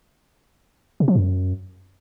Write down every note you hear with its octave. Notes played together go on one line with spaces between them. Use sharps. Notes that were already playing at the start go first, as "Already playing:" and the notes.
C3
F3
F#2